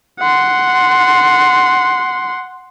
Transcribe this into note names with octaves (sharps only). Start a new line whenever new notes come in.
F#5 C6